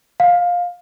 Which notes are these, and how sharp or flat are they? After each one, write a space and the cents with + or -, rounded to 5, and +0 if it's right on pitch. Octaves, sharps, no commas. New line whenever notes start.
F5 +15